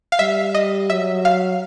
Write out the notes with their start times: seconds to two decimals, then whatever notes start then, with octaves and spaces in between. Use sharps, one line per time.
0.12 F5
0.19 G3 E5
0.55 D#5
0.90 F#3 E5
1.25 F5